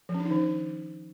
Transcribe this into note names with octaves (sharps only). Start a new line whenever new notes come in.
F3
C#4
D4
D#4
D#3